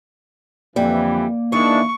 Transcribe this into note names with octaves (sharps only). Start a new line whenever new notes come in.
F2 D3 E3 G3 A#3
D#3 E3 G#3 D4 E4 C#6